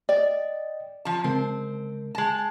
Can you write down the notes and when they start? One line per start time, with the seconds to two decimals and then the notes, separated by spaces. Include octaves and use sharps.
0.09 D5 D#5 G5
1.05 F3 A5
1.24 C#3 G#3 C4 A#4
2.15 G#3 A5